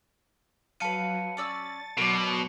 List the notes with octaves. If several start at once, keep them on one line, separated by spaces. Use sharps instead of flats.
F#3 B4 F5 A5 C#7 D#7
C#4 D5 E6 A6
B2 F#3 A#4 D5 C6